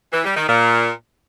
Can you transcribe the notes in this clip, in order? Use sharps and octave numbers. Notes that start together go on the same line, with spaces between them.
E3
G3
D#3
A#2